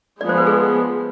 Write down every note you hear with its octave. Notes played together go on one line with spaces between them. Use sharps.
F3 G#3 B3 D5
C5
B4
G#4